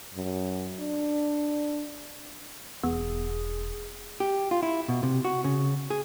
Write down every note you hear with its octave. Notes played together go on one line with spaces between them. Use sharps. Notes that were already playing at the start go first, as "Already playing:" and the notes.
F#2
D4
E1 B3 G#4
G4
F4
E4
B2
C3
F#4
C#3
G#4